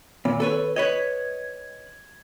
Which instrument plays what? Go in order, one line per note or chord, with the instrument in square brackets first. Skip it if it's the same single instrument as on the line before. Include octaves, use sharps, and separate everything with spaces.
[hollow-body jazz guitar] A#2 [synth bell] D#3
[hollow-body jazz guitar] A4 B4 C#5
[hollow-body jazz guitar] B4 C#5 D#5 [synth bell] G#6